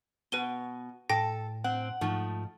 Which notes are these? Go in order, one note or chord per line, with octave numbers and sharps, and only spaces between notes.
B2 B4 D#7 G7
A2 A4 G5 A#6
C4 F#5
G#2 F3 A3 D#4